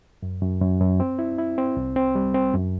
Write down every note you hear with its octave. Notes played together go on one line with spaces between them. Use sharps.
F#2
F#2
F#2
F#2
C4
E4
E4
C4
C2
C4
G3
C4
F#2